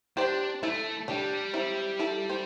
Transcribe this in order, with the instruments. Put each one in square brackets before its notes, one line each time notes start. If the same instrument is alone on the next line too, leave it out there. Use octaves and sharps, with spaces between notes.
[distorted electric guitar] D4 [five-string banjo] G4 C5
[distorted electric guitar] A3 [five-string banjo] E4 A4
[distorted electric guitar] G3 [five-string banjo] D4 G4
[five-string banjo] C4 E4
E4 A4
G4 C5